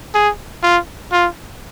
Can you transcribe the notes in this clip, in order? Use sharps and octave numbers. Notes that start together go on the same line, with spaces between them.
G#4
F4
F4